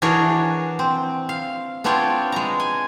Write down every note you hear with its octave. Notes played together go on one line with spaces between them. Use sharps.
E3 D4 F#4 G#4 A#4 C#5
C4
F5
B3 C4 D4 F4 C#5 G5
G#3 A#5
G#5